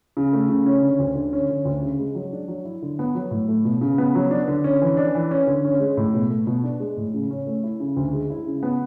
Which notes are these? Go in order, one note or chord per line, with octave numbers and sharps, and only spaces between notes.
C#3
A3
C#3
C#4
D3
D2
D3
C#4
D3
D2
C#3
G#3
F#3
D4
F#3
E4
D3
B3
F#3
A2
A3
B2
C#3
B3
F#3
D4
D3
C#4
E3
D4
E3
C#4
D3
C#4
G#3
A2
B2
A3
B2
D4
G#3
A2
C#3
C#4
A3
E4
C#3
D2
G#3
E4
C#3
B3